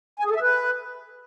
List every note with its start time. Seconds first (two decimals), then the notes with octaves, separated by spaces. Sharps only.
0.19 G#5
0.25 G#4
0.30 A4
0.36 E5
0.42 B4